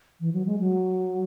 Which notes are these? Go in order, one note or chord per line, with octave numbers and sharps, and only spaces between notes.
E3
F#3
G#3
F#3